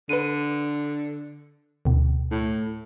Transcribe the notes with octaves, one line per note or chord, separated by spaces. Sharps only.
D3 B4 D#7
D2 B2
A2